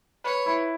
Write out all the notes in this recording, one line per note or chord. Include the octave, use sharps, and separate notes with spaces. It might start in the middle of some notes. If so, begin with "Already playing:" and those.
B4 C#5
E4